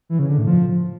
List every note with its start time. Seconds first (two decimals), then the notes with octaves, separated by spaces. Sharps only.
0.09 E3
0.19 C#3
0.28 D3
0.38 A2
0.47 F3